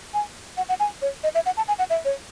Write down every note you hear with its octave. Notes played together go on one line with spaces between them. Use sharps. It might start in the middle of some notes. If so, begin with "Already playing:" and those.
G#5
F#5
F#5
G#5
C#5
D#5
E5
F#5
A5
G#5
F#5
E5
C#5